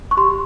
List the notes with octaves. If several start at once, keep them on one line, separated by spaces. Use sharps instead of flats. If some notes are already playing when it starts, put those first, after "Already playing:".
C#6
G4 C6